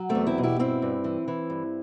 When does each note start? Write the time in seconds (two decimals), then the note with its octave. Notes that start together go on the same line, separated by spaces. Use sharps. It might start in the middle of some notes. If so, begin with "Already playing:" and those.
Already playing: F#3
0.09 A3 C4
0.15 E2
0.27 C4 E4
0.38 B2
0.43 E4 G4
0.59 G2 C4 E4
0.82 G2
1.04 E3
1.28 E3
1.50 G2